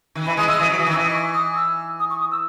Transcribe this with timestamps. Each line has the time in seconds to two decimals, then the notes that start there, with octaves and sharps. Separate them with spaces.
0.15 D#3
0.26 E3 B5
0.37 E3 G#3 D#6
0.48 E3 G#3 E6
0.59 E3 D#6
0.70 F#3
0.78 E3 D#6
0.86 D#3
0.91 E6
0.96 E3
1.03 D#6
1.12 C#6
1.34 D#6
1.55 E6
1.99 D#6
2.10 C#6
2.20 D#6
2.31 E6